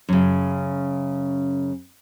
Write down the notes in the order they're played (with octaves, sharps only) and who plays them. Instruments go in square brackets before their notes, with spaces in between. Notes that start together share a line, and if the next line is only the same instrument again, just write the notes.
[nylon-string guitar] F#2 C#3